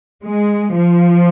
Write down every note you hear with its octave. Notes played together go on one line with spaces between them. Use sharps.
G#3
F3